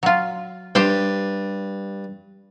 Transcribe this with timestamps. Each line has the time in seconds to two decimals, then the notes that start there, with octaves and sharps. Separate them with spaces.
0.03 F#3 F4
0.75 G2 G4 C5 G5